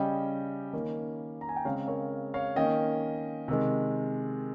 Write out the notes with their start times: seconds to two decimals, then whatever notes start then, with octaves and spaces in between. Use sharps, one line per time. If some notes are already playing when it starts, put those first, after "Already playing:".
Already playing: C#3 G3 C#4 D#5 G5
0.73 D#3 A#3 C#4
1.41 A#5
1.49 G#5
1.56 G5
1.65 C#3 G#3 C4 C#5 F5
1.88 A#4 C#5
2.34 C#5 F5
2.56 D#3 A#3 C#4 D#5 G5
3.48 C3 D#3 G#3